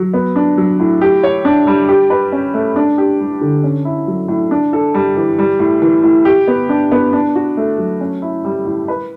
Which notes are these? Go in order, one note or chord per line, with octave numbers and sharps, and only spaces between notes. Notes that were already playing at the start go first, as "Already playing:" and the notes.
Already playing: F#3
B3
D4
F#3
A2
G4
C#5
D4
G3
G4
B4
C#4
A3
D4
G4
G3
D3
C#4
E4
F#3
A2
D4
A4
G3
E3
G3
A2
E3
A2
G4
B3
D4
B3
D4
F#4
A3
F#3
C#4
E4
G3
A2
B4